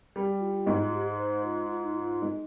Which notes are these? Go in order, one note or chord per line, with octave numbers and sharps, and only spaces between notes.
G3
G4
F4
F4
G#2 G#3 D#4
F4
G4
G#4
C5
F4
F4
D#4
F4
G#3 D#4